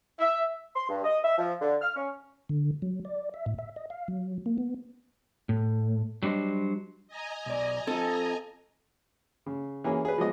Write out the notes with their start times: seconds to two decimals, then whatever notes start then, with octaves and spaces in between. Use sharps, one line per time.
0.20 E5
0.76 C6
0.89 G2
1.04 D#5
1.23 E5
1.37 F3
1.61 D3
1.81 F6
1.96 C#4
2.49 D3
2.82 F#3
3.05 D5
3.34 E5
3.46 A2
3.59 E5
3.76 D#5
3.90 F5
4.08 F#3
4.46 A#3
4.58 B3
5.49 A2
6.23 F#3 G3 D4 C5 D#5
7.08 D#5 G#5 A#5
7.46 B1 D5
7.87 C4 F4 A4
9.46 C#3
9.84 E3 A#3 C#4 G#4
10.05 G#4 B4
10.18 F3 F#3 G#3 B3 D#5